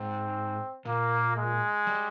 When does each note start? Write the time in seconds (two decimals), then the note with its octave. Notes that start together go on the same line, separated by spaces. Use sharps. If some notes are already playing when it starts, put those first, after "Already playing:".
Already playing: G#2 C4
0.85 A#2 A#3
1.36 G#3
1.87 G3